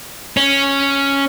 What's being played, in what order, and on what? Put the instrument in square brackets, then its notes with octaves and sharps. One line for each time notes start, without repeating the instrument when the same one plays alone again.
[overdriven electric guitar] C#4